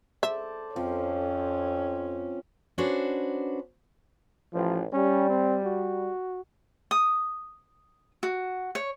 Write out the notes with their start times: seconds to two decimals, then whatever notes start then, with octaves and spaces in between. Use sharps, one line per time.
0.23 A4 C5 D5 E5
0.76 F2 F3 C4 C#4
2.78 C#4 D4 F#4 B4 C5
4.53 A1 F3
4.93 G3 C#4
5.30 C4
5.64 F#4
6.91 D#6
8.23 F#4
8.75 C#5